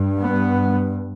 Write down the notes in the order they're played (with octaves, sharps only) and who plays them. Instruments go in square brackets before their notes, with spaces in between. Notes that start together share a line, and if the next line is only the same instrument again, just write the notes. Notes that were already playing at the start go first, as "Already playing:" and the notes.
Already playing: [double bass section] G2
B3